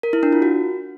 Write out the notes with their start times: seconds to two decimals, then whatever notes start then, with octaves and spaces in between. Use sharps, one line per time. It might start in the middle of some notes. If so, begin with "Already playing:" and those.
0.03 A#4
0.13 E4
0.23 D4
0.32 F4
0.42 F#4